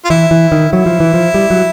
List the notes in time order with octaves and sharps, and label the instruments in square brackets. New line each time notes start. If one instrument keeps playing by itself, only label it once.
[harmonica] F4
[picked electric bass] E3 [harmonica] E4
[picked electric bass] E3
D#3
[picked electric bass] F#3 [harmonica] E4
[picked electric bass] F3
E3
F3
G3
F#3